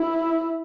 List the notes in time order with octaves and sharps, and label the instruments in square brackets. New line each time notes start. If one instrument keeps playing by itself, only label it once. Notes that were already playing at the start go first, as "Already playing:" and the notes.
Already playing: [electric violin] E4